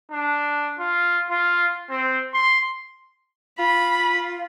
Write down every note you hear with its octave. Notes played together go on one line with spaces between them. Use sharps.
D4
F4
F4
C4
C6
F4 B5